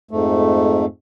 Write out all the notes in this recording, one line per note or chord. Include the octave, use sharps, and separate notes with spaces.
F2 G#2 A3